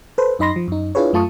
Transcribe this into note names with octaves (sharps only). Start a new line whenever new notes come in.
A4 B4 C5
F#2 D#4 D#5 B5 C6 A#6
F3
F#2 D#4
D4 E4 F4 G#4 B4 C#5
F#2 A3 F4 A5 C#6 D#6